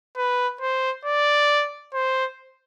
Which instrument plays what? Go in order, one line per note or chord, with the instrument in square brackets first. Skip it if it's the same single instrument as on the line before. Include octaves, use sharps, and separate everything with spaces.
[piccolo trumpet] B4
C5
D5
C5